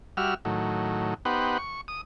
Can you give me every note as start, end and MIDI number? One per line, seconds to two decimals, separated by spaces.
0.17 0.34 55
0.17 0.34 66
0.17 0.34 76
0.17 0.34 89
0.45 1.14 45
0.45 1.14 51
0.45 1.14 54
1.25 1.58 59
1.25 1.58 63
1.25 1.58 67
1.25 1.58 71
1.25 1.58 72
1.25 1.58 78
1.58 1.81 85
1.88 2.01 87